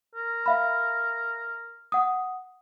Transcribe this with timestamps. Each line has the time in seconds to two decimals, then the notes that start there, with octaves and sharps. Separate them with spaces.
0.16 A#4
0.46 E5 F5 B5
1.92 F#5 D#6